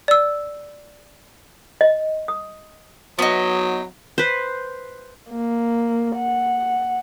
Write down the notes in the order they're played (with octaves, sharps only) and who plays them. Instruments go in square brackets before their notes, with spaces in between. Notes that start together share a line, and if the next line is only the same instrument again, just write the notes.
[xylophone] D5 E6
[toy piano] D#5
D#6
[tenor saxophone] F#3 [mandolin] B3 D#4
[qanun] B4 C5
[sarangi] A#3
F#5